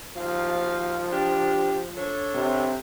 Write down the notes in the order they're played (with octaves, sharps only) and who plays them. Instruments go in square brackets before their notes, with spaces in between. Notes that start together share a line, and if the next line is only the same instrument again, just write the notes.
[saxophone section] D#2 F#4 F5 [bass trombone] F3
[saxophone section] D4 G4
D4 A4 C#5
[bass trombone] C3